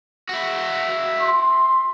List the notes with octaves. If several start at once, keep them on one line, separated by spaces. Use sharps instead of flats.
E4 F#4
C6